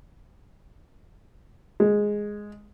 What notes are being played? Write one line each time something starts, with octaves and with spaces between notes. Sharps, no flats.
G#3